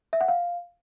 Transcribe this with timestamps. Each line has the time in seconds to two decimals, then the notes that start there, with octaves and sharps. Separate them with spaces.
0.13 E5
0.21 F#5
0.28 F5